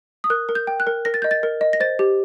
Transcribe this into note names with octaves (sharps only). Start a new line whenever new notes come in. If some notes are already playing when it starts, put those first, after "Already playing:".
D#6
A#4 F#6
A#4
G6
G5
F#6
A#4
A#4 A#6
A6
D#5 G6
A6
A#4
D#5
A#6
C5 A6
G4